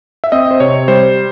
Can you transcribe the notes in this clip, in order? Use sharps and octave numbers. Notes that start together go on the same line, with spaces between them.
E5
C4 D#5
C5
C3 C#5
G3 C5